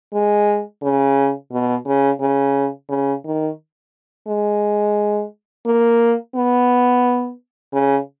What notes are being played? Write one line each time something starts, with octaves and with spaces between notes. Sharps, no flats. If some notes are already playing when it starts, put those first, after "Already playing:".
G#3
C#3
B2
C#3
C#3
C#3
D#3
G#3
A#3
B3
C#3